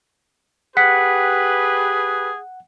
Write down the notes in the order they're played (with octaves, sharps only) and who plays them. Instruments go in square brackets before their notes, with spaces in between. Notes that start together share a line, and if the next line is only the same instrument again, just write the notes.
[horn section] G4 B4 [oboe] G#4 [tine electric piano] F#5 [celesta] B6